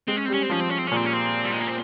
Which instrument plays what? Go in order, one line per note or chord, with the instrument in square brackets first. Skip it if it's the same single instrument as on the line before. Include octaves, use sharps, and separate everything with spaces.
[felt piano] G#3 [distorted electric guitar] C4
[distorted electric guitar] C#4
[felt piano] G3 [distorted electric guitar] C4
[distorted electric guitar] C#4
C4
[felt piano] F3 [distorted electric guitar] C#4
[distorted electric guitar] C4
C#4
C4
C#4
[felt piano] A#2 [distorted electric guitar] C4
[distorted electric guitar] C#4
C4
G3
G#3
A#3
C4